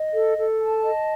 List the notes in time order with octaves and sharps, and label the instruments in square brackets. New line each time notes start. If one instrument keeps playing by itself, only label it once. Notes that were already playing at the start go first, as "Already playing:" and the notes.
Already playing: [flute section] D#5
A4
A4
A5
D#5